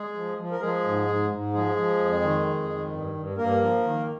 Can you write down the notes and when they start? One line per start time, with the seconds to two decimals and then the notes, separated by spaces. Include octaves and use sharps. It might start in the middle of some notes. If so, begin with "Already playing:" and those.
Already playing: G#3 G#4
0.15 F3
0.38 F3
0.52 A#4
0.61 F3 G#3 G#4
0.84 G#2
1.07 G#2
1.30 G#2
1.53 F3 G#3 G#4
1.76 F3
1.99 F2
2.22 D#3
2.46 F2
2.69 D#3
2.92 G2
3.14 G2
3.37 G2 A#3 A#4
3.60 F3
3.83 D#3